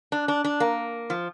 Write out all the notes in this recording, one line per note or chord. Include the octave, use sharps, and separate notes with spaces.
D4
D4
D4
A#3
F3